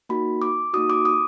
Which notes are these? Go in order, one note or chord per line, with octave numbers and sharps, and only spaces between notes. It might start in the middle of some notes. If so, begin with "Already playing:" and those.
A#3 D#4 F#4 B5
D6
A#3 D#4 F#4 D#6
D6
D#6